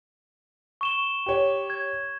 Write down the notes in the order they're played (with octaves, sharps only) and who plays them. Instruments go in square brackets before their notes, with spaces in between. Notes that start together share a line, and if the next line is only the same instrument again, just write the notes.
[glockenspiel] C#6 E7 G7
[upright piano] G4 C#5
[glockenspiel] G#6